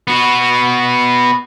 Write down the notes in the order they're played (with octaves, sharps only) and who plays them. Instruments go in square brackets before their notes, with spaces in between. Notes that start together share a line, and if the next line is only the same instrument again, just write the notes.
[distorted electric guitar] B3 F#4